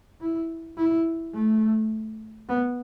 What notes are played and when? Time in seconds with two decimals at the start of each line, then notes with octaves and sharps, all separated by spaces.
0.21 E4
0.77 E4
1.34 A3
2.49 B3